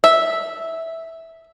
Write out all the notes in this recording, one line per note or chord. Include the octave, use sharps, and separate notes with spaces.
E5